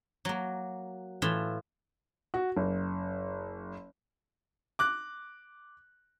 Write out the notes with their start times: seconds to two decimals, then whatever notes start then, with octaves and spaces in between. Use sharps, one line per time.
0.25 F#3 A#3
1.22 A2 E3 F4 E5
2.34 F#4
2.57 F#1
4.79 D6 F#6